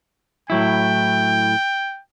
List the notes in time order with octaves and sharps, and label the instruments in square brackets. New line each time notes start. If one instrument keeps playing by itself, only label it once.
[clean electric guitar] A2 F#3 E4 [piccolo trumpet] G5